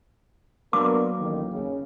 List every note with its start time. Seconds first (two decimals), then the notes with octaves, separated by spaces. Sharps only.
0.73 F#3 A#3 B3 D4 A#4 D6
1.19 A1 D#3
1.51 C#3